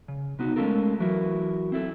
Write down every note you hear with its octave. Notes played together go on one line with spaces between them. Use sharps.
C#3
C3 B3 D#4 F#4
G#3 A3 C#4 F4 A4 A#4
E3 F#3 E4 F#4 A#4
C4 E4 A4